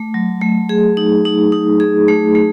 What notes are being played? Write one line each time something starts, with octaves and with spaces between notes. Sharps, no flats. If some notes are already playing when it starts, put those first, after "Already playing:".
Already playing: A3
F#3
A3
G#4
D#4
D#4
D#4
G#4
A3
A3